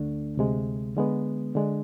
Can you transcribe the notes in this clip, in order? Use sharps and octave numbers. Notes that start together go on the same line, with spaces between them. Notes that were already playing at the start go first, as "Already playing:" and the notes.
Already playing: D2 D3 A3 D4
D2 C3 G#3
D3 G#3 B3
D3 G#3 D4